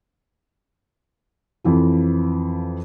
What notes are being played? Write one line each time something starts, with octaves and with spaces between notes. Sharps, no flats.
F2 E3 F3